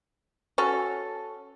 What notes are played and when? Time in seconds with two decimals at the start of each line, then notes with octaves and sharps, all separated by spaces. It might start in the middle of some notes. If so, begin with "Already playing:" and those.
0.58 C#4 F#4 A4